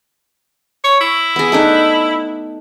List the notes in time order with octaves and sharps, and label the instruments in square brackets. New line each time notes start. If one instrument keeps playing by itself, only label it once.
[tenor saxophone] C#5
E4
[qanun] B3 G#4
A3 D4 D#4